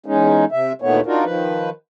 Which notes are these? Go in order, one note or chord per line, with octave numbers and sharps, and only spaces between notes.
E2 G#3 C#4 D#4
C3 E5
D2 A#2 D#3 A3 B3 C#5
D4 D#4 F4 F#4 A#4
D#3 F3 B4